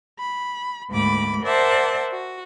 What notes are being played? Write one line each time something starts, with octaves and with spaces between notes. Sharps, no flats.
B5
D2 G#2 A#3 B5 D6
A#4 C5 D5 E5 F#5 A5
F#4